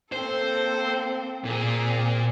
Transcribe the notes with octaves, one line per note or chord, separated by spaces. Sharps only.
A#3 C4 A4 C5
A#2 C4 G#4